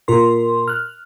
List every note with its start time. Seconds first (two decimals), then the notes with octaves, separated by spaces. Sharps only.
0.08 A#2 F4 A#4 C6
0.68 F6 F#6